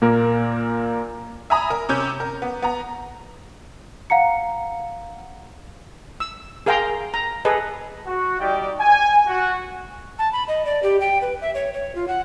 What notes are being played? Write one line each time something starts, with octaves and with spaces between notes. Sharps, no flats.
A#2 A#3 A#4
E5 G#5 A#5 B5 D#6
A#4
C3 C#4 G6
A#4
B3
B3 A#5
F5 F#5 A#5 C#7
E6
G#4 A#4 F5 G5 A#5 C6
A#5
G#4 A4 B4 D#5
F#4
G3 D#4 G4 D5 G5
G#5
F#4
A5
B5
D#5
D5
G4
G5
B4
E5
C#5
C#5
F4
F#5